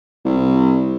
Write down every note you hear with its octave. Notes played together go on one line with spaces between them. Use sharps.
C2